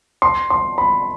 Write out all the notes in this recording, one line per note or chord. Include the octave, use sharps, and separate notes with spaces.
C6
C6
B5